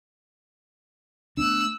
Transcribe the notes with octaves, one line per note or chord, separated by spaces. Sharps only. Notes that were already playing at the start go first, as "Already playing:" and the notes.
A3 B3 D4 E6 F#6